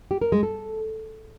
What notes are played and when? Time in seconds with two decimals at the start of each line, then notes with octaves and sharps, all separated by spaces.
0.11 G4
0.21 A#4
0.32 G#3
0.43 A4